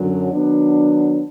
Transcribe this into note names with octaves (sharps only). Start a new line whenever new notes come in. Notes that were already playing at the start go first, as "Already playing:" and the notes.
Already playing: F#2 D3 F#3
D#3 F#3 B3 D4